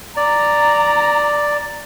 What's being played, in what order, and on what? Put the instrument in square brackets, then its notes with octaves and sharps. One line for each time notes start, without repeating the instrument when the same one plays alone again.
[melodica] D5 [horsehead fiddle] A#5